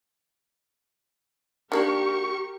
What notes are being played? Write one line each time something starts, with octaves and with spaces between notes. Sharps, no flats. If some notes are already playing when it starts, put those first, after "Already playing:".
D#3 A#3 D4 G4 A#4 C#6